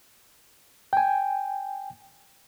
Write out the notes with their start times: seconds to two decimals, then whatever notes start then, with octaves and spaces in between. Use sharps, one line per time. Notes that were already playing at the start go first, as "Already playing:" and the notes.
0.93 G5 G#5